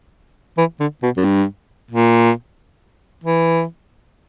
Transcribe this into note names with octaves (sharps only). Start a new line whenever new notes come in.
E3
D3
B2
F#2
G2
A#2
E3